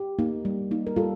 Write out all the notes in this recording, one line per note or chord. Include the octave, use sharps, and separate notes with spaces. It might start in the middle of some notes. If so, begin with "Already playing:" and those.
Already playing: G4
A#3 D#4
G3
A#3 D#4
A#4
G3 F4 A4